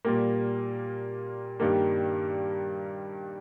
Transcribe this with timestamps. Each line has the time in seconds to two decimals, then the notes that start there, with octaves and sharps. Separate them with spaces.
0.05 A#2 G3 A#3
1.60 G2 D#3 G3 A#3